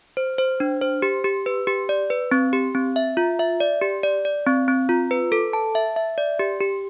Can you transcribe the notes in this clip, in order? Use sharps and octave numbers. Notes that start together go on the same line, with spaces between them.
C5
C5
D4
C5
G4
G4
B4
G4
D5
B4
C4
G4
C4
E5
F4
E5
D5
G4
D5
D5
C4
C4
F4
B4
A4
A5
E5
E5
D5
G4
G4